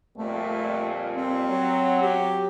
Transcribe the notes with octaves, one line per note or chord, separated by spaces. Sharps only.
F2 A#2 G3 A3
C4
F#3
G4